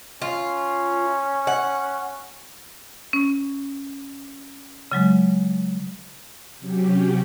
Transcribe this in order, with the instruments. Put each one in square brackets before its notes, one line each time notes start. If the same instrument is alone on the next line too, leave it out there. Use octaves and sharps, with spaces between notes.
[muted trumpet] C#4 [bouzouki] F4
[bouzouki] F#5
[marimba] C#4
C#3 F#3 G#3
[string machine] C3 F#3 C#4 G4